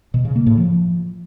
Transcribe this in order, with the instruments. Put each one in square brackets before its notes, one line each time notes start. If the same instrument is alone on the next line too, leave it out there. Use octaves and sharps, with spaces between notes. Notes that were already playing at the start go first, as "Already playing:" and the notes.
[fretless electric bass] B2
C#3
A#3
A2
F3